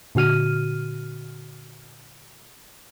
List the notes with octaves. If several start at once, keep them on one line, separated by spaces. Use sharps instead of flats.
A#2 D3 F#4 F6 D#7